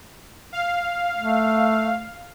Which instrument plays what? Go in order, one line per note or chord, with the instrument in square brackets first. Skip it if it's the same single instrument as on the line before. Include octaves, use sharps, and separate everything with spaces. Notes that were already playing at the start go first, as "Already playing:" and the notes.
[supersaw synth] F5
[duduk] A3